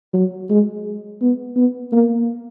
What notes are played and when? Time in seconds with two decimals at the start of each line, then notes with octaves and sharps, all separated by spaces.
0.14 F#3
0.50 G#3
1.21 B3
1.56 B3
1.93 A#3